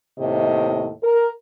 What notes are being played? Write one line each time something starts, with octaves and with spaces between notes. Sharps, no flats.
D#2 A2 C3 D#5
A#4